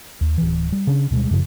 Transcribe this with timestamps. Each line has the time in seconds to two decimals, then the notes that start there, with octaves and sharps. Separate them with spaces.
0.21 D#2
0.38 D1 E3
0.72 G3
0.87 C#3 C#4 D4
1.11 D2 B2 G3 G#3
1.31 F#2 A2 C#3 F3